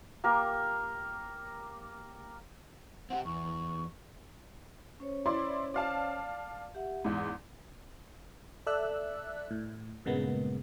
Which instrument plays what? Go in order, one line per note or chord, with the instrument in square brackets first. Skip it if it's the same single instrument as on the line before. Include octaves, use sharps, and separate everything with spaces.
[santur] A#3 G4 A#4
[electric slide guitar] C4 F4 G4 [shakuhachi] F#5
[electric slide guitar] E2 [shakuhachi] C#6
[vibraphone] C#4 C5 C#5
[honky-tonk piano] E4 D5 C6
D5 F5 A5
[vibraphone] G4 E5 F#5
[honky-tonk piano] E2 G#2 [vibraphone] D6
[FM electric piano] A4 D5 E5 E6 F#6
A2
G2 A#2 C#3 G#3 A#3 B3